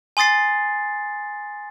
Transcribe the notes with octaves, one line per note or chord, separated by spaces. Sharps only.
G#5 C6 D#6 A6 C7